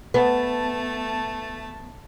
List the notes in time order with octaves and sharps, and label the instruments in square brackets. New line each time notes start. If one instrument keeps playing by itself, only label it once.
[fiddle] A3 A5 [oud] B3